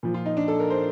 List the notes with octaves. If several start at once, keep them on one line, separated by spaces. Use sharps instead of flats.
A#2 F3
F4
D#4
D4
A4
A#4
C5